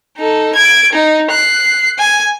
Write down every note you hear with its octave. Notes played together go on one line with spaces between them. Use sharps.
D#4 A4
G#6 D7
D#4
F#6 C7
G#5